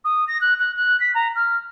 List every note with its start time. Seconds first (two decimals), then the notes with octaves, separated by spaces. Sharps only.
0.04 D#6
0.28 A#6
0.41 F#6
0.59 F#6
0.76 F#6
1.00 B6
1.15 A#5
1.35 F6